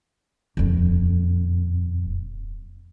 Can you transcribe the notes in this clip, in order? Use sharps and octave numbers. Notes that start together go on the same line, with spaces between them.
D#1 F2